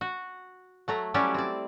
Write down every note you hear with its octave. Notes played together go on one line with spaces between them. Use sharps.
F#4
F#3 A3 A#5
F#3 G3 C#4 E4 G4 D5
C4 D5